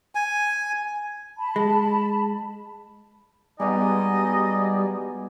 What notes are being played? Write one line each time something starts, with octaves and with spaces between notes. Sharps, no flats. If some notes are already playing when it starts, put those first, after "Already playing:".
G#5
A5 B5
G#3
B2 G3 G#3 B3 D#4 D5 D#5 G#5